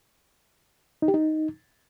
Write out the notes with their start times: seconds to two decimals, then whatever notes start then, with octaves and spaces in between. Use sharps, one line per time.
1.02 D#4
1.08 G4
1.14 D#4